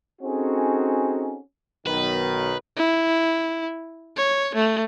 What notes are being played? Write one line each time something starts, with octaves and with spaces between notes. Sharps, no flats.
C4 C#4 D#4 F#4 G#4 A4
B1 D#3 B4
E4
C#5
A3